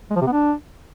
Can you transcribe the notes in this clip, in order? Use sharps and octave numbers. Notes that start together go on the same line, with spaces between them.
G#3
F3
C3
B3
D4